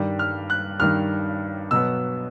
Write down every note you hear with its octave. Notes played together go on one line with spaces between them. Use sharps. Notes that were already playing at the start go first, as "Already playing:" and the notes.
Already playing: G2 D#3 G3
F6
F#6
G2 D#3 G3 F6
B2 F#3 B3 E6